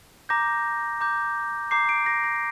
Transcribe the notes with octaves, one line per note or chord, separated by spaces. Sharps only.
A#5 D6 G6 A#6
A#5 D6 G6
A#5 D6 G6 C7
D7
A#6
A#6